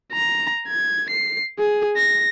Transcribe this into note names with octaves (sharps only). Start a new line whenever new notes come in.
A#5
G#6
C7
G#4
A#6